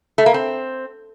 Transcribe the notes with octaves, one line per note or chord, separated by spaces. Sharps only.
A3
A#3
C4